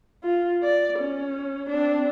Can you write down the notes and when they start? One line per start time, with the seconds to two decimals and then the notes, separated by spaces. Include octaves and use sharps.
0.24 F4
0.63 D5
0.99 C#4
1.69 C4 D4